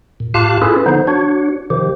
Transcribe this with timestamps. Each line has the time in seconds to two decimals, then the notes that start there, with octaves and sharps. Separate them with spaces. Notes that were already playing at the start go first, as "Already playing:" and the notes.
0.20 A#2
0.34 A2 F4 G4 F5 A5 F#6
0.62 C#4 E4 F4 G#4 A4 B4
0.86 D3 F3 B3 D#4 C5
1.07 D4 F#4 C#5
1.70 C3 D#3 F3 G4